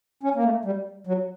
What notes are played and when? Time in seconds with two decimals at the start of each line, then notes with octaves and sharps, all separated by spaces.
0.23 C#4
0.35 A#3
0.44 A3
0.65 G3
1.07 F#3